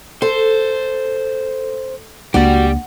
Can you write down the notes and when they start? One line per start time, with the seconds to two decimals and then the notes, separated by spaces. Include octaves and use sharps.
0.22 A4 C5
2.34 C#2 A#3 D4 F#4 G4 D5